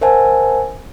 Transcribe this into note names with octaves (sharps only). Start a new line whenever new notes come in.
A#4 C5 E5 F#5 G#5 A5